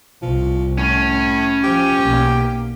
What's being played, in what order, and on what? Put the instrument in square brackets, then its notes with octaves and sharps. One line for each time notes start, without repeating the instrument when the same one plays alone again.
[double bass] C2 [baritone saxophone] F3
[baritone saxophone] A2 [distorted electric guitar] C#4
[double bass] F3 [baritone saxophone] G4
[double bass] B1 A#3